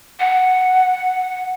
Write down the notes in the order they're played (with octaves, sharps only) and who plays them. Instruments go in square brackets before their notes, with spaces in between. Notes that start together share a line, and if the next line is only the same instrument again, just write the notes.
[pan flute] F#5